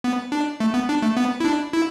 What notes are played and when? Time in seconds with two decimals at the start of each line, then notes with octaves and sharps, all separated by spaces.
0.04 B3
0.32 D4
0.60 A3
0.74 B3
0.89 D4
1.02 A3
1.17 B3
1.40 E4
1.45 D4
1.73 E4